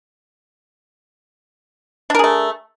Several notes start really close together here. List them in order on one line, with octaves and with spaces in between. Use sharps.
D4 A#4 G#4 A3